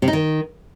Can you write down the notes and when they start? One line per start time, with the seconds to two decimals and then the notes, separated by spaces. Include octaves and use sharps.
0.02 C3
0.08 D#4
0.13 D#3